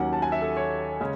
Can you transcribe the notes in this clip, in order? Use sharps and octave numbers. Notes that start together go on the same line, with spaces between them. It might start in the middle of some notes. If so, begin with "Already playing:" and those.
Already playing: D#2 D#3 F#3 C#4 F#5
A5
G#5
E5
A4
C#5
C#3 G#3 C#4